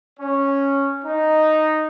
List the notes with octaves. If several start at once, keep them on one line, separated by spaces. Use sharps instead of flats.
C#4
D#4